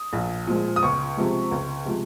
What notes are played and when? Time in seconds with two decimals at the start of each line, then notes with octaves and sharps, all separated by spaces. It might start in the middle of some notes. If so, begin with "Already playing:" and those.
Already playing: D#6
0.13 A#1
0.47 A#2 F3 G#3
0.76 D#6
0.83 C#2 C#6
1.17 C3 F3 G#3
1.51 C#2
1.85 C3 F3 G#3